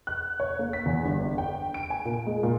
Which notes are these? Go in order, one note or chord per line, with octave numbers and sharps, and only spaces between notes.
F#6
C#5
A#3
B6
E2
G1
G5
D7
G#5
A#2
G#3
A#2